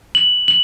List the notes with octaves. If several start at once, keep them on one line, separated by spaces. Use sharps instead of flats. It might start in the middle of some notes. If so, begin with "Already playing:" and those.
F#7
F#7